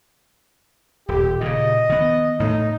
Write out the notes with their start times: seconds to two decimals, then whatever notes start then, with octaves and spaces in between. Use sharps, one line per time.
1.08 D#1 G4
1.41 A#2 C#3 D#5
1.90 D#3 B3
2.40 A2 D#4